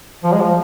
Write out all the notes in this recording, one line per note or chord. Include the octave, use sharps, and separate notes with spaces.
F3
G#3
F3